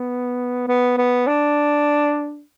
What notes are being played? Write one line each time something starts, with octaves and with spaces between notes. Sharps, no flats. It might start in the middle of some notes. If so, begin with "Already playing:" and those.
Already playing: B3
B3
B3
D4